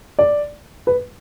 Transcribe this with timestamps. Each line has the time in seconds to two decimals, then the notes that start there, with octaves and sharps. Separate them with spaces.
0.19 D5
0.87 B4